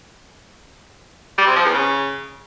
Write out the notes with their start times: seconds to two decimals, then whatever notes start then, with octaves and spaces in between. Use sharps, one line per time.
1.38 G3
1.47 C3
1.56 F3
1.65 E2
1.74 C#3